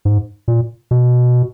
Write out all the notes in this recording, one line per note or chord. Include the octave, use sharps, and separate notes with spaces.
G#2
A#2
B2